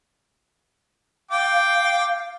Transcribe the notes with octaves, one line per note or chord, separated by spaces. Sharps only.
F5 G5 D6